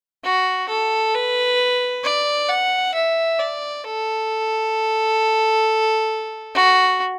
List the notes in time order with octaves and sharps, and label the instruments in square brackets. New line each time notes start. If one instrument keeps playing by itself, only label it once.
[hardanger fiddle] F#4
A4
B4
D5
F#5
E5
D5
A4
F#4